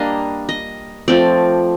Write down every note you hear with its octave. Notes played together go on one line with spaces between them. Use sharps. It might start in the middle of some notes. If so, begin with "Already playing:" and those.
Already playing: G3 A#3 D4 D#5 F5
D#5
F3 A3 C4 D5